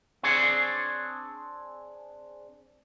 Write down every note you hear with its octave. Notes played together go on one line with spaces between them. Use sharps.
C4 D4 G#4 C#5